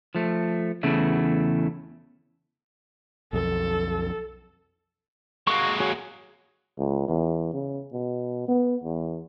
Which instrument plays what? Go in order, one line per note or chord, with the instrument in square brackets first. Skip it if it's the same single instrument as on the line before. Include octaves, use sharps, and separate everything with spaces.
[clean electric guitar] F3 A3
E2 C#3 A3 E4
[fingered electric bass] B1 F2 [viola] A4
[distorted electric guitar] G#3 A#3 [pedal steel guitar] F#4 C#6
[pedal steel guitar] F#4 G#4 C#5
[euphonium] C#2
E2
C#3
B2
B3
E2